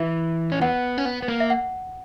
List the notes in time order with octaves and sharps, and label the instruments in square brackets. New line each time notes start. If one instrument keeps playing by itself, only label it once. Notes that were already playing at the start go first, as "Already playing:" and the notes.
Already playing: [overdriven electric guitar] E3 [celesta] E5
[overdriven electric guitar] C#4
[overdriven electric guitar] B3 [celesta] F#5
[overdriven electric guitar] C#4
B3
B3
A#3
[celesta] E5
F#5